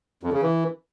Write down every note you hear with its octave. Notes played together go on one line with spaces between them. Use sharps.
F2
C#3
E3